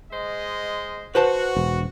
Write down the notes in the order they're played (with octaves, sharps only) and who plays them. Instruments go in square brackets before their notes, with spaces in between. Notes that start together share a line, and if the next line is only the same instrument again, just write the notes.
[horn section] G#3 C5 D#5
[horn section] F#4 [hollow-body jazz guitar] B4 C5 A5
[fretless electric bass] E1